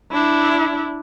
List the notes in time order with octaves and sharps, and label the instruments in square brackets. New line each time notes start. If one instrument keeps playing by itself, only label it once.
[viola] D4 E4